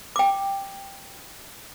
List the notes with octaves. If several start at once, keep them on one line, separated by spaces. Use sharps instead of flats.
G5 D6